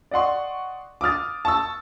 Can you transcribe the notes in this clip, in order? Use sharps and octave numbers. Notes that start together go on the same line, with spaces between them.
D5 D#5 F#5 C6 C#6
D6 D#6 F6 A6
A5 C#6 E6